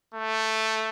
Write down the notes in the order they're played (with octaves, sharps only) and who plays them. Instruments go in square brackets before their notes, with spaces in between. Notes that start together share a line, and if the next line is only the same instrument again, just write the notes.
[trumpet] A3